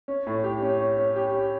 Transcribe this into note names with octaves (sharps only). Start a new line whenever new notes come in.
C#4
A2
G4
C#4
C#4
C#4
G4
C#4